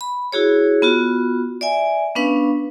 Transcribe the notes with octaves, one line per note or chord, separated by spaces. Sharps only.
B5
E4 F#4 G#4 C#5
B3 F4 F#4
D5 E5 G#5
B3 C#4 D4 B4 F5